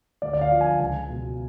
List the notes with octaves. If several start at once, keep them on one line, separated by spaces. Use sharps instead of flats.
D2 D5
D5
F5
D3 F3
G#5
C#2 G#5
B2